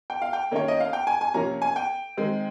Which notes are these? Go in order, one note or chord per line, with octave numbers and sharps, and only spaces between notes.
G5
F5
G5
D#3 A#3 C#4 C#5
D#5
F5
G5
G#5
G#5
C3 F3 A#3 C#4 A#5
G#5
G5
D#3 G#3 C4